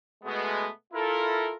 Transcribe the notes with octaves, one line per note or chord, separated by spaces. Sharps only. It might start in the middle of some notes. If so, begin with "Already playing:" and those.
B2 G#3 A3 B3
E4 F4 A4 A#4